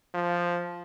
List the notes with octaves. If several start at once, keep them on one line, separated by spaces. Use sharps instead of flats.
F3